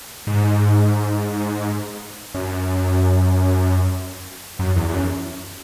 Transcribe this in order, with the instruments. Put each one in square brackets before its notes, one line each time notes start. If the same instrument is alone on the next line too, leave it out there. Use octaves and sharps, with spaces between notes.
[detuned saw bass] G#2
F#2
F#2
E2
E2
F#2